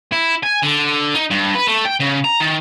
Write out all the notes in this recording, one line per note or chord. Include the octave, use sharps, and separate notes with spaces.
E4
G#5
D3
D#4
G2
B4
A3
G5
C#3
A#5
D#3